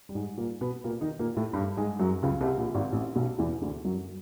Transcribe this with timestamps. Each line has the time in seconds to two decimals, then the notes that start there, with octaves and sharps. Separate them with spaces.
0.09 G3
0.15 G#2 G#3
0.37 A#2 A#3
0.61 B2 B3
0.84 A#2 A#3
1.01 D#3 D#4
1.19 A#2 A#3
1.37 A2 A3
1.53 G2 G3
1.77 G#2 G#3
1.99 F#2 F#3
2.23 C#2 C#3
2.41 C2 C3
2.57 A#1 A#2
2.75 G#1 G#2
2.92 A1 A2
3.15 B1 B2
3.38 E2 E3
3.61 D2 D3
3.85 F#2 F#3